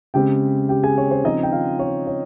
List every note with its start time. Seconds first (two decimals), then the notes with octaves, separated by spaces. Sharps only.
0.14 C#3 G#3 C4 G4 G5
0.69 G4 G5
0.83 G#4 G#5
0.98 C#5
1.11 C5
1.24 C#3 F3 C4 D#4 D#5
1.43 G5
1.52 F4 F5
1.79 C#5
2.07 C#5